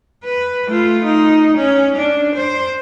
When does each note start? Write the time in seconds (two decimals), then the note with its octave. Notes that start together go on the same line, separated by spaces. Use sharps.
0.24 B4
0.68 A3 F4
1.04 D#4
1.57 C#4
1.95 D4
2.35 C5